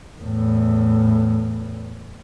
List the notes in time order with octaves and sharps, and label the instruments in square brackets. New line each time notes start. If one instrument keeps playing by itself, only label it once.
[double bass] E2 A2